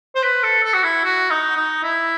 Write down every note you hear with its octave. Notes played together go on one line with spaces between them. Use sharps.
C5
B4
A4
A4
F#4
E4
F#4
D#4
D#4
E4